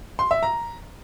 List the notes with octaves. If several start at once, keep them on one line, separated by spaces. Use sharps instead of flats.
C6
E5
A#5